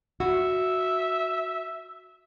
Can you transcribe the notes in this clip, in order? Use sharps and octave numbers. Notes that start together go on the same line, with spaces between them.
F#4 E5